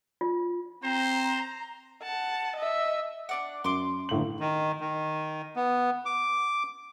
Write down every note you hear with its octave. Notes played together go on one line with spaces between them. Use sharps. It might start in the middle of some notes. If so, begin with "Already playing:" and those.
F4
C4 C5 A#5
F#5 A5
D#5 E5
D4 D5 F#5
F#2 C6 D6
G1 A2 F#7
D#3
D#3
B3
D6